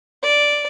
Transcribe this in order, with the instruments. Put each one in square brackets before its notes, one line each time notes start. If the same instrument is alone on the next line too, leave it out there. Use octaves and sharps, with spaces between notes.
[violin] D5